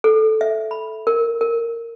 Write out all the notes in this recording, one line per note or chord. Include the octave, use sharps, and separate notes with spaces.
A4
E5
B5
A#4
A#4